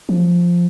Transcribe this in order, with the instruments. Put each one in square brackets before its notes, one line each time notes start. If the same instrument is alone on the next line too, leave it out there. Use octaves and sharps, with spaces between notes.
[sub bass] F3